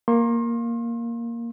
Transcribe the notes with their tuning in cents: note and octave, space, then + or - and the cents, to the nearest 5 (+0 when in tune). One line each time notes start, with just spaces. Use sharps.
A#3 +0 C6 +40